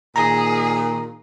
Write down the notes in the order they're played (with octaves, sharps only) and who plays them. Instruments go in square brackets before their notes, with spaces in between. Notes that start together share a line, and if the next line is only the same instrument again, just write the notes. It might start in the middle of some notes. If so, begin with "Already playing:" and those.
[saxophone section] A#2 D#3 [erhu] G#4 [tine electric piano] A#5